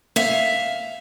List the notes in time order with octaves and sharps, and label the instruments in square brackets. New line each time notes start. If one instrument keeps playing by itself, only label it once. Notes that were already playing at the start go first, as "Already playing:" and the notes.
[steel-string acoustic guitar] E5 F5